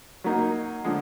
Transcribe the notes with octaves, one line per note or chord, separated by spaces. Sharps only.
F#3 A#3 D#4
D3 F3 G#3